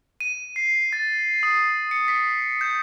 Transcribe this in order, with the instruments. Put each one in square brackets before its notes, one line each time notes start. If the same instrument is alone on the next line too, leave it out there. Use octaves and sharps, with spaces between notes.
[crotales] D#7
C7
A6
D#6
C#7
B6
G6